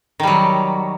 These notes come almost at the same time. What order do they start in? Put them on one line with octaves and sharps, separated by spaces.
D#3 G3 F#3